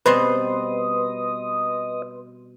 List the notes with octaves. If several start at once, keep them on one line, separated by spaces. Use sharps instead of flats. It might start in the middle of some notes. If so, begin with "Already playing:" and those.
B2 G3 C4 B4 D#5 C6